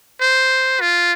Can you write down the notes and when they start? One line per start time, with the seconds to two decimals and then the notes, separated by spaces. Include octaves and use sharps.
0.21 C5
0.81 F4